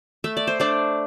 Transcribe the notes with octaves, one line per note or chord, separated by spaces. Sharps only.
A3 E5
D5
C5
A3 D4 D5